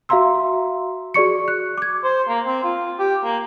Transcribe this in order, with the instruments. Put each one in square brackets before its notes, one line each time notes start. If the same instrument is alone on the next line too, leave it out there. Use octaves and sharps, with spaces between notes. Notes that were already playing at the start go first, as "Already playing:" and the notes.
[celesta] F#4 E5 F5 A#5 C6 E6
F#4 G#4 D5 C#6 C#7
F#6
D6 G#6
[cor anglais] C5
A#3
C4
F4
G4
A#3